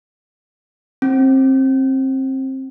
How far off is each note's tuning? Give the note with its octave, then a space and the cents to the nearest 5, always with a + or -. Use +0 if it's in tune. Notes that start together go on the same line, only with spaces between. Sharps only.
C4 +25